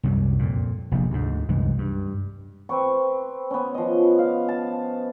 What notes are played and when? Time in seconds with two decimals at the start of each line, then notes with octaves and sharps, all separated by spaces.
0.03 C2 F#2 F#3 G3
0.39 F2 A#2
0.91 F1 A#1 C3
1.10 D2 G#2
1.49 C2 F#2 E3 G#3
1.78 G2
2.69 C4 B4 C#6
3.51 B3 C#4
3.74 F3 D#5
4.18 F5
4.48 A5